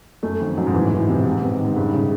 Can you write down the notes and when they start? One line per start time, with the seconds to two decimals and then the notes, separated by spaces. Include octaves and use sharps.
0.23 F#2 A3
0.40 F2 D#3
0.57 F#2 F#3
0.67 G#2
0.73 A2 E3
0.91 E3
1.09 C3
1.25 G#2 C3
1.42 B3
1.60 G#2 D#3
1.76 G2 C#3
1.94 C#3